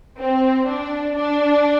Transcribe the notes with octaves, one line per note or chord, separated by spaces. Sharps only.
C4
D4
D4